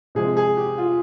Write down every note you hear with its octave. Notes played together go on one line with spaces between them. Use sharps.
C3 F3 G#3 C4 G#4
G#4
G4
F4